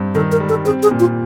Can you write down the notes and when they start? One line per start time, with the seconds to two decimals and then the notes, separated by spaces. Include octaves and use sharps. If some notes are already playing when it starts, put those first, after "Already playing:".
Already playing: G2 C4
0.15 D#3 A4
0.32 A#4
0.40 G3
0.49 A4
0.65 C4 G#4
0.83 G#4
0.91 A#2
1.00 F4